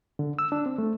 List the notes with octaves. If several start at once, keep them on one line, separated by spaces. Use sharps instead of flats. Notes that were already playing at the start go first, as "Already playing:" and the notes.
D3
E6
D4
C4
A3